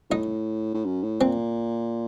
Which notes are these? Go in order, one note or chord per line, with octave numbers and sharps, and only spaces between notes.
A2 D#4
A2
F#2
A2
A#2 C4